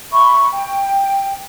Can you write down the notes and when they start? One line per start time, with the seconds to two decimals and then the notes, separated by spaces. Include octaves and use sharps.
0.12 E5 B5 C#6
0.52 G5